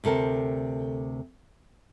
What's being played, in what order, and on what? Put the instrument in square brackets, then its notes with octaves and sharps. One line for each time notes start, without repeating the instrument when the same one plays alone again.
[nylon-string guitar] D2 C3 A4 A#4 C5